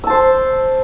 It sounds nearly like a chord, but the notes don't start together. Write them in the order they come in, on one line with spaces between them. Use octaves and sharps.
E6 A5 C5